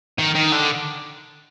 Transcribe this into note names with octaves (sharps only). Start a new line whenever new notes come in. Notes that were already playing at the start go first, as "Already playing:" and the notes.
D#3
D#3
D3